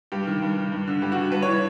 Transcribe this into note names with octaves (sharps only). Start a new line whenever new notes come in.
G2 G4
D#3
G2
D#3
G2
D3
G2 G4
F#4
D3
G2 B4
C#5
E3
C#5